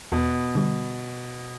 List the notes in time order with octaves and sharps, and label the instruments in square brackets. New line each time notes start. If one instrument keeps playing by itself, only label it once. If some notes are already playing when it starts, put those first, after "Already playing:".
[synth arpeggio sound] E2 [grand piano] B2
[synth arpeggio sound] D3 G3